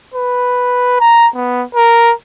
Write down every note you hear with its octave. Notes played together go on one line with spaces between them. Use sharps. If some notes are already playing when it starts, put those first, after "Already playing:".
B4
A#5
B3
A#4